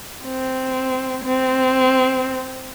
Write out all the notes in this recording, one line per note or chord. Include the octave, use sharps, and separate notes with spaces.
C4
C4